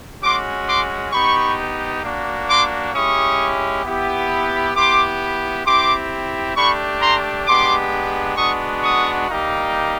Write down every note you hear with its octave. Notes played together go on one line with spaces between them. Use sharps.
G#3 C#4 F#4 C6 D6
C6 D6
B3 D#4 G4 B5 C#6
A#3 D4 F#4
C6 D6
G#3 C#4 E4 G4 C#6 D#6
B3 E4 G4
B3 E4 G4 C6 D6
C4 E4 G4 C6 D6
A3 D4 G4 B5 C#6
A#5 C6
G#3 B3 D4 G4 C6 D6
G#3 B3 D4 F#4 C#6 D#6
C#6 D#6
G3 A#3 D#4 G4